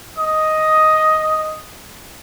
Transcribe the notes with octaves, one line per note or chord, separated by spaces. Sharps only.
D#5 D#6